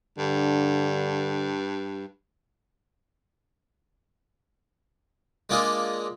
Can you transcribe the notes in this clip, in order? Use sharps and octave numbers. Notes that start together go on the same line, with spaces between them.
G2 D3
G#3 A#3 D4 F4 G#4